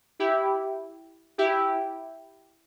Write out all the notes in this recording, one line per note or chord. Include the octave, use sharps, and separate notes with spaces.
E4 G4
E4 G4